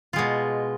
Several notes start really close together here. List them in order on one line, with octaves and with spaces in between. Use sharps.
F4 G#3 B2